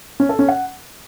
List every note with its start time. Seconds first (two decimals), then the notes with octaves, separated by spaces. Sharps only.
0.20 C#4
0.29 A4
0.39 C#4
0.48 F#5